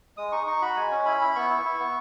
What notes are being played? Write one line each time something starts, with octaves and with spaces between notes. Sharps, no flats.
G#3 D#6
D#4 C#6
D#4 C#6
F#4 B5
G#3 G#5
C#4
E4 B5
E4
B3 C#6
E4
E4
B3